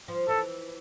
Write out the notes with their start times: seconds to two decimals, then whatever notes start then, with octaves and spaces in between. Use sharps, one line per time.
0.08 F3
0.28 E3 A4